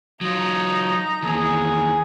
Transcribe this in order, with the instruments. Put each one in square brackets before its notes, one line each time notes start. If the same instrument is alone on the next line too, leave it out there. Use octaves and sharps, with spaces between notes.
[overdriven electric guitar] F#3 F4 [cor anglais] D#4 [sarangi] A#5
[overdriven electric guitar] D#2 E3 [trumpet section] G#4